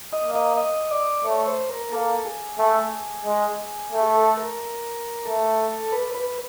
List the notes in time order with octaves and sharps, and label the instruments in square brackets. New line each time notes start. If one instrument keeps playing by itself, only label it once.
[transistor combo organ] D#5
[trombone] A#3
[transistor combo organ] D#5
D#5
D5
[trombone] A3 [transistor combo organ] C#5
[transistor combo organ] C5
A#4
[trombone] A#3 [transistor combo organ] A4
[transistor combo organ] G#4
[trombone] A3
G#3
A3
[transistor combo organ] A4
A#4
[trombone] A3 [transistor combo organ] A4
[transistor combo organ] B4
B4